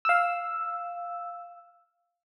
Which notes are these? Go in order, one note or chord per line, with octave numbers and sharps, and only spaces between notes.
F5 E6